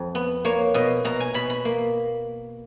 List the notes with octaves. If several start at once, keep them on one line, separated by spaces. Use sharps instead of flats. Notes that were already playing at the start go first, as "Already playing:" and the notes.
Already playing: F2
B3
A#3 C#5
B2 D#5
B2 A#5
G#5
B2 B5
B5
A#3